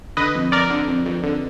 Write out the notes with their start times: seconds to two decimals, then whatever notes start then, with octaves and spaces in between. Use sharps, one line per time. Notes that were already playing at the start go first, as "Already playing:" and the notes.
0.17 D3 B4 D#5
0.35 F2
0.52 F2 A#4 D5
0.70 D3
0.88 F2
1.06 F2
1.23 D3